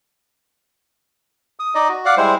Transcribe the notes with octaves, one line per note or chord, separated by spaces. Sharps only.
D#6
D#4 D5 D#5
F#4
D5 F5 F#5
G3 G#3 E4 C5